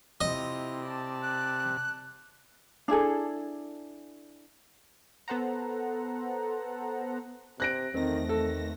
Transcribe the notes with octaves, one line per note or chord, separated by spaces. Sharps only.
C3 E4 F4 D#5
D5 A5
F#6
D4 E4 G#4 A4
B3 A4 C5 F#5 A#5
C3 F#6 A#6 D7
E2 D#3 A3 C4 A#6
D#3 A4